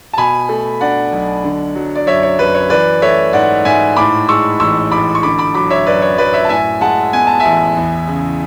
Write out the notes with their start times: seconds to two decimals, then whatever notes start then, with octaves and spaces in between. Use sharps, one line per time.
0.13 A5
0.17 B2 G#5 B5
0.49 A3
0.81 D4 D5 F#5
1.12 B1
1.44 D3
1.75 F#3
1.95 D5
2.07 F#2 C#5 E5
2.23 C#5
2.38 F#2 B4
2.54 C#5
2.70 E3 B4 D5
3.02 A3 C#5 E5
3.33 G#2 D5 F#5
3.65 G#2 E5 G#5
3.96 A2 B5 D6
4.29 G#3 C#6 E6
4.60 A1 C#6 E6
4.91 A1 B5 D6
5.15 C#6
5.23 D3 B5 D6
5.38 B5 D6
5.54 F#3 B5 D6
5.70 C#5 E5
5.86 F#2 B4 D5
6.02 C#5
6.18 F#2 B4 D5
6.33 C#5 E5
6.45 A5
6.49 A2 E5 G#5
6.81 G#3 F#5 A5
7.13 B3 G#5
7.27 A5
7.40 A1 E5 G#5
7.76 E2
8.08 C#3